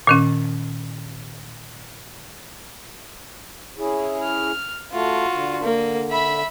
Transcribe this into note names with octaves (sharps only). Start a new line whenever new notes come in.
A#2 D#3 C#4
C#4 E4 G#4
F6
A3 F4 F#4
D3
A#3
E5 B5